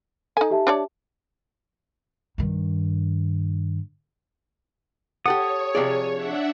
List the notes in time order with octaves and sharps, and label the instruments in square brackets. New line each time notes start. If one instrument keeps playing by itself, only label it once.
[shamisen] D#4 G#5 [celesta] A4
[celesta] G4 E5 A5
[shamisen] D4 C#5 D5
[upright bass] G2 D#3
[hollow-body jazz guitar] G4 A4 F#5 [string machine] C#5 [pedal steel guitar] D#6
[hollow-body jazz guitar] C3 F3 D5 [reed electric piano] G#4
[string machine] D4 E5 F#5